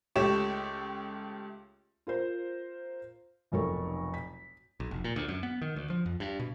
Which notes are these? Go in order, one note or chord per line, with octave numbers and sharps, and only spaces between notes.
C#2 A3 G4 C#5 E7
F4 A#4 C5
F1 B1 A4 A#4 C#5 C#6
B6
B1
F1
A#2
D2
F#2
B3
D#3
D2
F3
F2
G2
B2